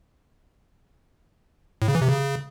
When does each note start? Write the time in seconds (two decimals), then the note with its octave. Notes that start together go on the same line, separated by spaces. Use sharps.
1.82 A2
1.88 C#3
1.95 E3
2.02 C3
2.08 C#3